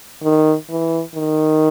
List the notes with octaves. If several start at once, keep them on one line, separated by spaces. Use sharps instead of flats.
D#3
E3
D#3